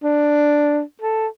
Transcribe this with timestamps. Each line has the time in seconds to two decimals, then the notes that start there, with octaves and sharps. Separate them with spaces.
0.04 D4
1.02 A4